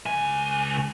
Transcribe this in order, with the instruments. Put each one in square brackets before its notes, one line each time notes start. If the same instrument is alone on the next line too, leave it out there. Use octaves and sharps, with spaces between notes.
[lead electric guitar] C#2 G#5